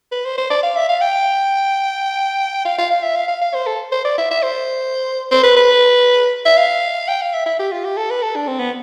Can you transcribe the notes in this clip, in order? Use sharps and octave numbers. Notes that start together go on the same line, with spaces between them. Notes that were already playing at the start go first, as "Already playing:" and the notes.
B4
C5
C5
D5
F5
E5
F5
G5
F5
F5
F5
E5
F5
F5
F5
C5
A4
C5
D5
E5
E5
C5
C5
B4
B4
E5
F5
G5
F5
E5
E5
G4
F4
G4
A4
B4
A4
D4
C4
B3